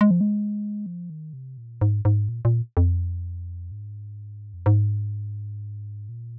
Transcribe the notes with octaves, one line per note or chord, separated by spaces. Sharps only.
G#3
F3
G#3
F3
D#3
C3
A#2
G#2
G#2
A#2
A#2
F2
G#2
F2
G#2
A#2